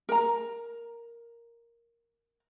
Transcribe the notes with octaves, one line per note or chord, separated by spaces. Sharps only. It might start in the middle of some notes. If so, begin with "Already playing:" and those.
A#4 A#5